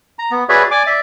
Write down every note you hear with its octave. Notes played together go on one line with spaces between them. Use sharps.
A#5
B3
F#4 G#4 B4 C#5 D5 E5
D5 G#5 D6
D5 E5